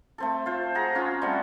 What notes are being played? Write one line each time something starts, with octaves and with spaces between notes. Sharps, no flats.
A3 C4 A4
F4 C5
G#4 F#5 A#5
C#4 F4
G3 A3 C4 F#5